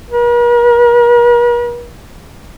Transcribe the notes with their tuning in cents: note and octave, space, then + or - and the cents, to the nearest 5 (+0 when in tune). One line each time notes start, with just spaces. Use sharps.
A#4 +45